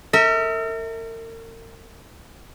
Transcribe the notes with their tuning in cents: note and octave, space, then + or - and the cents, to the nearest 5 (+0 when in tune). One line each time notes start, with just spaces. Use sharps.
A#4 -40 E5 -30